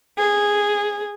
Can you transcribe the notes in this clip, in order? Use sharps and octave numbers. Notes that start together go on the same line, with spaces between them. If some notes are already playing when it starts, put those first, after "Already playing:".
G#4